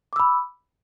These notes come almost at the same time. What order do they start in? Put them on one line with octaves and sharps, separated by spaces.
D6 E6 B5